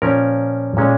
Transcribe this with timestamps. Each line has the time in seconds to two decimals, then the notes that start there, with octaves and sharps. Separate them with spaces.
0.02 A#2 F3 C#4 A#4
0.77 A#2 G#3 C#4